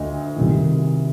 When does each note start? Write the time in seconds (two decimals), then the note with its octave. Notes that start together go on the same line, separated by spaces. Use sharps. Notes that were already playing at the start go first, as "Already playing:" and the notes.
Already playing: D2 D3 D#5
0.36 C2 C3 D#3